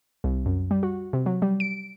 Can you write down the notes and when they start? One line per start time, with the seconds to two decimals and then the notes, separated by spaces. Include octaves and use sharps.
0.24 C2
0.46 F#2
0.71 G3
0.83 F#4
1.13 C3
1.26 F#3
1.42 G3
1.60 D7